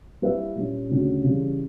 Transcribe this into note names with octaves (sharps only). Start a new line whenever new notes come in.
G3 A#3 E4 B4 E5
A#2 G3 C#4
D2 C#3 G3 C#4 F#4
C#3 E3 G3